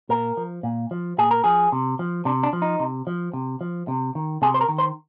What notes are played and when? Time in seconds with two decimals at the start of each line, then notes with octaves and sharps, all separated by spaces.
0.09 A#2 A#4
0.37 F3
0.63 A#2
0.91 F3
1.18 A#2 G#4
1.31 A#4
1.44 F3 G#4
1.72 C3
1.99 F3
2.25 C3 D4
2.43 D4
2.53 F3
2.62 D#4
2.80 C3
3.07 F3
3.33 C3
3.61 F3
3.88 C3
4.15 D#3
4.42 C3 G#4
4.54 C5
4.61 A#4
4.69 D#3
4.78 C5